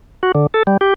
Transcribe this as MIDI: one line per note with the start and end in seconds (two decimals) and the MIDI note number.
0.23 0.32 66
0.35 0.47 50
0.54 0.63 69
0.67 0.77 55
0.81 0.94 67